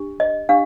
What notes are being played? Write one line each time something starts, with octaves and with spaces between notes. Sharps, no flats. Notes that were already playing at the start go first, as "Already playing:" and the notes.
Already playing: D4 G4
D#5
D4 G4 F5